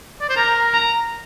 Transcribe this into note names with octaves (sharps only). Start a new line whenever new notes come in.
D5
C5
A#4 A#5
A#5